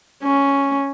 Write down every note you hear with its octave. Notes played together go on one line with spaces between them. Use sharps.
C#4